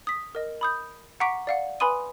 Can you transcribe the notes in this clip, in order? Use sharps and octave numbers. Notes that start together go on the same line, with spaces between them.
D#6 B6
A#4 D#5
B5 D#6 G6
F#5 A#5 C#6 D6 B6 D7
D5 F5 F#5
B4 G#5 B5 C6 D#6 D#7